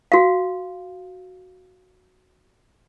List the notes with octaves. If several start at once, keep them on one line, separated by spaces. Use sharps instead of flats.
F#4 F5